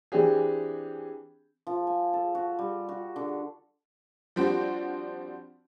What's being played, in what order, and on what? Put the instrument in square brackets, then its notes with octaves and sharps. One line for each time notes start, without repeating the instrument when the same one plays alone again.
[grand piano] E3 C4 D4 G4 G#4
[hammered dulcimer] F3
G#5
A4
F#4
G3
F#4
D3
[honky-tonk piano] F3 G3 C4 D4 F#4